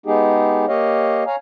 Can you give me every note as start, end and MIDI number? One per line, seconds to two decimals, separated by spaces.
0.06 0.66 56
0.06 0.66 59
0.06 0.66 63
0.06 0.66 67
0.06 0.66 68
0.68 1.24 58
0.68 1.24 67
0.68 1.24 73
0.68 1.24 75
0.68 1.24 77
1.27 1.36 73
1.27 1.36 77
1.27 1.36 80
1.27 1.36 82